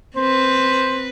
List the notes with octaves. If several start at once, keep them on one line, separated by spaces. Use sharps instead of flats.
C4 B4 C5